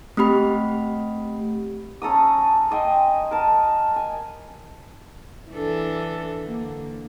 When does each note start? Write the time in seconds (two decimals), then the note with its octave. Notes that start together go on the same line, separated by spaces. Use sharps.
0.17 A3 C4 G4 B5
2.02 C#4 A4 A#5 D#6
2.71 C5 D#5 G5 G#5
3.31 A#4 A5
3.96 G#5
5.52 E3 D4 A4
6.42 D3 A#3